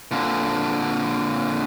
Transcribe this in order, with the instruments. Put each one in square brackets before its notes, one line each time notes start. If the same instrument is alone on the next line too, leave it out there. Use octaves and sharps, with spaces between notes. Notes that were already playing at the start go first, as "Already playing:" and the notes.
[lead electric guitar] A#2 D3